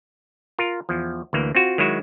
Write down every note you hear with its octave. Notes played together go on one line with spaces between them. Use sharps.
F4 A#4
E2 F3
D2 E3 A#3
C4 F4 F#4
D#3 F#3 G#3 E4 F#4